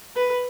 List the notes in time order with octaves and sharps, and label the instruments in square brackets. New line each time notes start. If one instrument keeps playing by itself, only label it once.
[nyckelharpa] B4